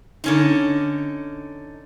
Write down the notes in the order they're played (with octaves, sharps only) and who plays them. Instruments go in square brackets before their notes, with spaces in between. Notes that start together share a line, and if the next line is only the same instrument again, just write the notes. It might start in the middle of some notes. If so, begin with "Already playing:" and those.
[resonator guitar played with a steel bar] D3 C#4 D#4